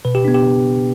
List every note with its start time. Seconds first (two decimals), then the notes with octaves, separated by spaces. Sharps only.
0.05 B2 B4
0.15 G4
0.25 B3 D4
0.35 G4